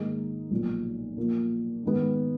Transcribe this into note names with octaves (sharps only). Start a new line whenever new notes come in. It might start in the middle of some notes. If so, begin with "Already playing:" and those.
Already playing: G#2 D#3 A#3 D#4 G#4
B1 A#2 F3
A#2 F3 A#3
G#2 D#3 G#3 B3